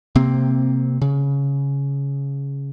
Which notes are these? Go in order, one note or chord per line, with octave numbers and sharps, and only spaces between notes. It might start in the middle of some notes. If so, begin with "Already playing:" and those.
C3 A#3 C4
C#3